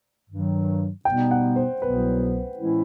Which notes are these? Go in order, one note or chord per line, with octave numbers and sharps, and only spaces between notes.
G2 D#3 F#3
B2 G3 B3 D#4 G5
F#5
C5
C2 B2 F#3 B3 B4
A2 E3 G#3 C#4 E4